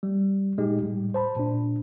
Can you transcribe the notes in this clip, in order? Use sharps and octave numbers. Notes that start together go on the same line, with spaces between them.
G3
A#2 G#3 D#4 G4
A2 G3
C5 A5 B5
A#2 D4